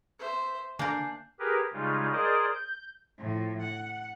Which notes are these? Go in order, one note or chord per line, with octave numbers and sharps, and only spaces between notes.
C5 E5
D3 A#3 D4 A#4 G#5 G6 C7
G4 G#4 A#4 B4
C#3 G3 G#3 D#4 F4
G#4 A#4 C5 D5 D#5
G6
A2 F3
F#5